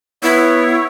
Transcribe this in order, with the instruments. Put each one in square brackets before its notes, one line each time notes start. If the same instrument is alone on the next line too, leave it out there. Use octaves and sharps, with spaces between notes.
[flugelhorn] B3 [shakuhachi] E4 [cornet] C#5